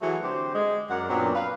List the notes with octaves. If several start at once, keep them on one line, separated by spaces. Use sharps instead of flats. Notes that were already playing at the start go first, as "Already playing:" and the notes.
E3 F#3 A3 F#4 G#4 F#5
D3 C4 G4 C5
G#3
F#2 A#4 D5 F#5
F#2 A#2 F#3 B3 C4 D4
B4 F5